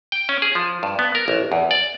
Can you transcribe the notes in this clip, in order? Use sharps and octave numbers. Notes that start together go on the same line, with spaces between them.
G5
C#4
G#4
F3
G2
B3
A#4
A1
E2
D5